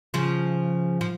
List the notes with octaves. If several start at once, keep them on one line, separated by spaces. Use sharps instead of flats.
C#3 F3
F3